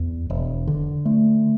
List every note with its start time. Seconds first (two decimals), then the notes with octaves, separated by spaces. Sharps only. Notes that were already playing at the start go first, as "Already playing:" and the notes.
Already playing: E2
0.30 E1
0.67 D3
1.05 A3